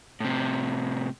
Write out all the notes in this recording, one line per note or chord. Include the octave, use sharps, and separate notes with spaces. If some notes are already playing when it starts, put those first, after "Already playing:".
A2 C3